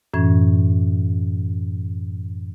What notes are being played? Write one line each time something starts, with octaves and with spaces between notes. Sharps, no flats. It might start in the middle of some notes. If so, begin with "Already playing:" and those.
F#2 A2 E3 C#4 G#6